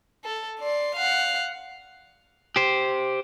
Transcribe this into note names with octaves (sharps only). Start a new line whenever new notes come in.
A4
D5 C6
F5 F#5
G4 C5